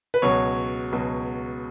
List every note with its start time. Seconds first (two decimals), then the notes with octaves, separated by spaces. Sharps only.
0.14 B4
0.22 C#2 B2 F#3 C#5
0.92 C#2 B2 F#3